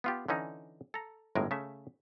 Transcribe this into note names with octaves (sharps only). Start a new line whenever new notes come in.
B3 F4 G4
D3 E3 C#4 D#4
A4 A#5
G1 A2 G#3 A#4 G#5
C#3 A3 E5